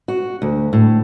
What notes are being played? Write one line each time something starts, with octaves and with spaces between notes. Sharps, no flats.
F#4
D2
A2